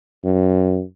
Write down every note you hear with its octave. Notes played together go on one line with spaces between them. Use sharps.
F#2